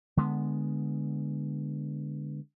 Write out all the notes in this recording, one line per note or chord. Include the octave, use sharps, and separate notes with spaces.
D3 G#3 B3